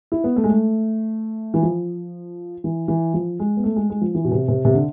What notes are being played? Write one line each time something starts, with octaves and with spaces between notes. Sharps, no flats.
E4
B3
A3
G#3
A3
E3
F3
E3
E3
F3
G#3
B3
A3
G#3
G#3
F3
E3
B2
C3
C3
C3
D3